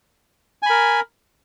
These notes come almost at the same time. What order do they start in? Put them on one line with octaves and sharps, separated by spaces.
G#5 B5 A#4